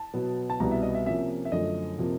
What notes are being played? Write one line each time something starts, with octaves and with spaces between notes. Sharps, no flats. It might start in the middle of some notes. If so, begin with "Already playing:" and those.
Already playing: A5
B2 F#3 B3
A5
C2 B2 G3 B3 A#5
E5
D#5
E5
C3 F3 A#3 C#4 E5
E5
F#2 D3 F3 A3 D#5
C3 F3 A#3